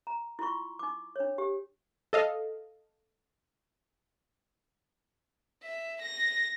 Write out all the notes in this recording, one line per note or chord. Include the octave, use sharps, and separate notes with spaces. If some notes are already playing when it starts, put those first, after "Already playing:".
A#5
E4 F4 C6 C#6
D#4 D6
D4 C#5
G4
A4 D#5 F5
E5
A#6